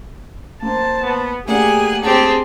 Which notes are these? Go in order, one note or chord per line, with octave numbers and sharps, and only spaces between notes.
A#3 C5 A5
B3
A3 A#3 G4 G#4 D5 F#5 G#5
C4 D4 G4 G#4 A5